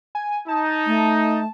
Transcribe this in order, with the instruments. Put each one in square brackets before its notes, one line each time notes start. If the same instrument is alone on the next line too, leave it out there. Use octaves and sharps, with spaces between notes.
[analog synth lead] G#5
[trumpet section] D#4 [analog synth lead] A5
[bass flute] A3